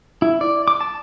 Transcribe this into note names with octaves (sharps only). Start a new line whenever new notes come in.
E4
D5
D6
A5